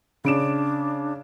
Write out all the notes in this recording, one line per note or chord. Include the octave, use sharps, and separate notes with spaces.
C#3 D4 D7 E7